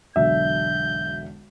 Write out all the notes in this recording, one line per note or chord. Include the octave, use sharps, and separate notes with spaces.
E1 B1 D3 E5 G6